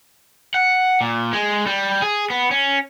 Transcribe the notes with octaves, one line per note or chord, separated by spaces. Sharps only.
F#5
A#2
G#3
G3
G#4
B3
C#4